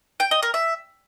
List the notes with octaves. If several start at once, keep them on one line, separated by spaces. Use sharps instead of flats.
G5
D#5
A#4
E5